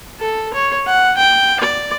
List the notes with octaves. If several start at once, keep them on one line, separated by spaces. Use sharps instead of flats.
A4
C#5
F#5
G5
D5